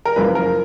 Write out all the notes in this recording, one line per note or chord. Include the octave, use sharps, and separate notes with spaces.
A#4
F#1 F#2 F3 B4
A#4